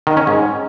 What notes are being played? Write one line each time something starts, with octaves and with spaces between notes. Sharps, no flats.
D#3
C#4
G#2